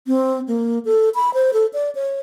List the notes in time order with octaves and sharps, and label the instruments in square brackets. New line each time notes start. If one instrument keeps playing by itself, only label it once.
[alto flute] C4
A#3
A4
B5
C5
A4
D5
C#5